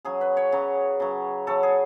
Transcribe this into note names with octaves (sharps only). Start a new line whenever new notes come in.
C#3 F#3 G#4
B4
C#5
C#3 F#3
C#3 F#3
C#3 F#3 A4
G#4